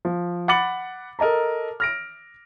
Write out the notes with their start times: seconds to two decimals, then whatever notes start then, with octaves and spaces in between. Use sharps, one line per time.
0.05 F3
0.48 F#5 B5 D6 A6 C#7 F#7
1.19 A4 A#4 D#5 A5 A#5
1.80 F6 A#6 D7